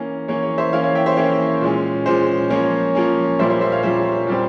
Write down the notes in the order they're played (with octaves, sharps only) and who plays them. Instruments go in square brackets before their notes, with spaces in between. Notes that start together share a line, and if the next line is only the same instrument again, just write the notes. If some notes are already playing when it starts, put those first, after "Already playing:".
Already playing: [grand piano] E3 A#3 C#4
E3 A#3 C#4 C#5
C#5
C5 E5
E3 A#3 C#4 C#5 F5
C#5 F5
E5 G5
C5 E5
E3 A#3 C#4 C#5
A#2 G#3 C#4
A#2 G#3 C#4 C5
F3 A#3 C#4 C#5
F3 A#3 C#4
A#2 G3 A#3 C#4 C5 E5
C5 E5
C5 E5
C#5 F5
A#2 G3 A#3 C#4 C5 E5
A#2 G3 C4